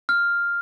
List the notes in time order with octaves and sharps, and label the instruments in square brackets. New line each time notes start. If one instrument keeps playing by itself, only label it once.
[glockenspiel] F6